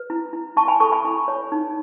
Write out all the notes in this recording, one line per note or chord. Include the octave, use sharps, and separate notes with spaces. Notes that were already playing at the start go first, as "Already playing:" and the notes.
Already playing: B4
E4
E4
E4 A5 C#6
G#5 B5
A4 A5 C#6
G#5 B5
E4
C#5
D#4